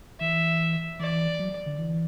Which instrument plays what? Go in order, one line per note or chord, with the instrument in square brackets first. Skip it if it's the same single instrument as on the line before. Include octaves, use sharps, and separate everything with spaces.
[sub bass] E3 [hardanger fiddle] E5
[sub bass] E3 [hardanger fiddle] D5
[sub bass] F#3
D3
E3